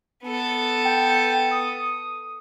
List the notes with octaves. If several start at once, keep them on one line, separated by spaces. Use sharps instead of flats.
B3 A4
G5
D#6